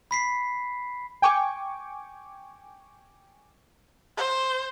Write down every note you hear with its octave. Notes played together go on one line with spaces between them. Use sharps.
B5 B6 C7
G5 G#5 C#6 D6
C5